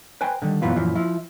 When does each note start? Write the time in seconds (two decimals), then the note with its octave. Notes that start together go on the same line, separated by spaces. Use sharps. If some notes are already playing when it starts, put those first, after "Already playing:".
0.21 B4 C5 G5 G#5
0.42 D3 D#3 G3
0.62 F#2 A#2 E3 B3 F4
0.76 F#2 A#2 E3 F3
0.95 F3 E4